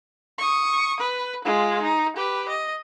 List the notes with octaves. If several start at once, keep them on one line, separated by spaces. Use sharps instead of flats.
C#6 D#6
B4
G#3 F4
D#4
G4 B4
D#5